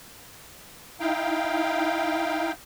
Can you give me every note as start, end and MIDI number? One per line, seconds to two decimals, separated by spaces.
1.00 2.52 63
1.00 2.52 64
1.00 2.52 77
1.00 2.52 79